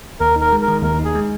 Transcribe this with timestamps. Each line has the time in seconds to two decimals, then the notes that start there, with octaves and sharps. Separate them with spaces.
0.20 D#2 A#4
0.36 D#4 A#4
0.52 G#3
0.62 A#4
0.68 D#3
0.83 D#2 A#4
0.99 D#4
1.05 G#4
1.15 G#3